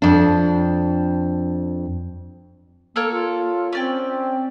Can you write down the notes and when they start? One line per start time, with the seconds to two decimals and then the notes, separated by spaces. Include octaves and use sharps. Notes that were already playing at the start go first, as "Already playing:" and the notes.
0.02 F2 D4
2.96 A#3 A4 A#4 C#5
3.12 F4
3.73 C4 C#4 D5 G5